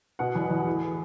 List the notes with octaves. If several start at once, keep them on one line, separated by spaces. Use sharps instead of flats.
B2 F#5
E2
E2
A2